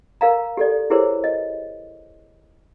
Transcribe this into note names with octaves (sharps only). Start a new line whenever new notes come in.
A#4 F5 A#5
G4 A4 D5
E4 G4 G#4 A#4 C5 C#5
D#5